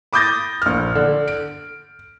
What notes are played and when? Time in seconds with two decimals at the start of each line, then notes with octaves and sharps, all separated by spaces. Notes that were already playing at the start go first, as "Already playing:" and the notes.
0.13 B5 D6 D#6 G6 A6 A#6
0.62 A#1 F6
0.95 D3
1.28 D7